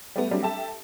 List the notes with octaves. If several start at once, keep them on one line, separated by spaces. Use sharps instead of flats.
G3 A3 B3
F#3 G3 A3 C4 D4
G4 A4 E5 A5